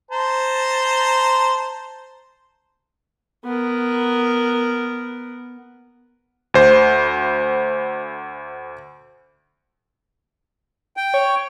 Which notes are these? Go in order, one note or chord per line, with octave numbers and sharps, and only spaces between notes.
C5 A5 A#5
B3 A#4
D2 C5
G5
C#5